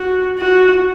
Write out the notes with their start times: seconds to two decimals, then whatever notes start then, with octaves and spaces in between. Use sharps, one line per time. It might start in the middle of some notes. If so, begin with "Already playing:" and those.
Already playing: F#4
0.39 F#4